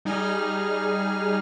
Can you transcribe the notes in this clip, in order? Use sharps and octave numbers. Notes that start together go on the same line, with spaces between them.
G3 D#4 G#4 F6